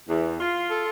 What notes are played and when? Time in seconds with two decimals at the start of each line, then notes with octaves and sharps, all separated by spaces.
0.09 E2
0.40 F4
0.70 A4